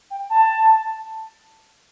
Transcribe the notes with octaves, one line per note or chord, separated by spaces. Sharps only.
G5
A5